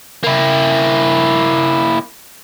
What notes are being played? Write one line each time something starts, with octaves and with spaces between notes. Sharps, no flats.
A#3 E4